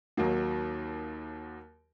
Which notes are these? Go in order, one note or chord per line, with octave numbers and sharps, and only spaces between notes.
D#2 D#3 F#3 A#3